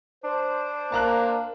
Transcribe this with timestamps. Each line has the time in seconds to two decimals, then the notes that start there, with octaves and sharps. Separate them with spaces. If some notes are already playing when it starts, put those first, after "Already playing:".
0.24 D4 C5
0.92 A#3 A5 A#5 F#6